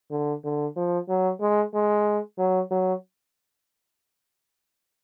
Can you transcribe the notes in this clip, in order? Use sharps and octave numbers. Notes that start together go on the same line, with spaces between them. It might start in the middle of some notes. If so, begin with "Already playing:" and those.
D3
D3
F3
F#3
G#3
G#3
F#3
F#3